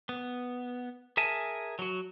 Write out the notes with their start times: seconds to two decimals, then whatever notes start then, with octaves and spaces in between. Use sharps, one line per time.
0.09 B3
1.17 G#4 A#4 E5 G#5 A5
1.79 F#3 F#4